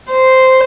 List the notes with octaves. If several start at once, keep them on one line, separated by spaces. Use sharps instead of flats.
C5